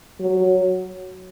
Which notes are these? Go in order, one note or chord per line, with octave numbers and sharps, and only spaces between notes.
F#3